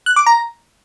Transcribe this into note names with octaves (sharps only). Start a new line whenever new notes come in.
F#6
D6
A#5